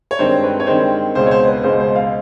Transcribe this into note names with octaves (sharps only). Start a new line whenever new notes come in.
C#5
G2 D#3 G#3 C4 C5
B4
C#5
G2 D#3 G#3 C4 C5
C#2 B2 G#3 C5
C#5
C5
B4
C#2 B2 G#3 C5
C5
F5